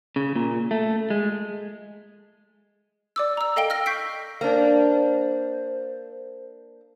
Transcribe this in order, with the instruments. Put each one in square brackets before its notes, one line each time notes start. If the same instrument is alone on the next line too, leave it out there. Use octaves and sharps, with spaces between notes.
[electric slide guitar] C#3
A#2
A3
G#3
[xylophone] D5 D6 E6
A#5 E6
A4 D#5 F5 G5 D7 G7
E6 F6 A#6
C#6 G6 B6 C7 D7
[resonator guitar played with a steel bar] A#3 D4 [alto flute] C5